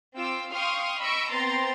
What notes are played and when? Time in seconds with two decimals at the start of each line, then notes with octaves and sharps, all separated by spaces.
0.15 C4 F4 D6 E6
0.53 F5 G5 C6 C#6 D#6 F6
1.00 D#5 B5 C#6 E6 D7
1.32 B3 C4 G5 A#5 C6 A6